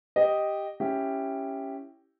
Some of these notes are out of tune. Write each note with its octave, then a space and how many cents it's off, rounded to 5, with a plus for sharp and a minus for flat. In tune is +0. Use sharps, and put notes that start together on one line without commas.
G4 +0 D#5 +0
C#4 +0 E4 +0 G4 +0